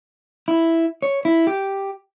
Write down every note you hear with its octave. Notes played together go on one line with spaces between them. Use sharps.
E4
C#5
E4
G4